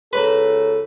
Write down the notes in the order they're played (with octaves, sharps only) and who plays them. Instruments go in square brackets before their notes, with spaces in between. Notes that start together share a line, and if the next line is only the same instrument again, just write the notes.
[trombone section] C#2 A4 [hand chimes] G#4 C#5 A#5 [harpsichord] B4